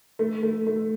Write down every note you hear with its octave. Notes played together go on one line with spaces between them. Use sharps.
A3
A3
A3